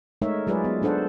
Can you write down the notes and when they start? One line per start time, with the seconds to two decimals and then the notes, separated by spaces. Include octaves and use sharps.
0.22 G#3 A3 D#4 A#4 C#5 E5
0.47 F#3 G#3 F4 G#4 B4 D5
0.64 B3
0.82 G#3 D4 A4 C5 F#5